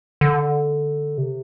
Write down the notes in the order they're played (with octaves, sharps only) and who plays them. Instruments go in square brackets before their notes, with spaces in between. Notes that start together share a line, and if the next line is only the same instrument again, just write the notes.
[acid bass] D3
C3